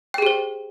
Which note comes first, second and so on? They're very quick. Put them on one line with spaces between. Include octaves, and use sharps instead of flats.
G5 G#4 G4 C5